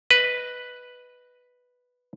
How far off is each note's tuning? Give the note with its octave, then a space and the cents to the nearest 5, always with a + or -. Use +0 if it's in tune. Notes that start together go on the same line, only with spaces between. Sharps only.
B4 +0 D#5 +0